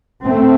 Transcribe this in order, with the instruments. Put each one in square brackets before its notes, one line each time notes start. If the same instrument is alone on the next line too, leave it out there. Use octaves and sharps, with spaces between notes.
[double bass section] A3 C4